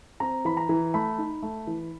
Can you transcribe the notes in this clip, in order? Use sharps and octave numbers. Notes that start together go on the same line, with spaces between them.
C4 A#5
E3 B5
A#5
E3
A3 B5
D#4
A3
E3